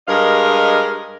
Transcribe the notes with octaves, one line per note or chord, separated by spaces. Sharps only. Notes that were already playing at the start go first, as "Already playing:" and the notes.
G2 G#3 A#4 D#5 F5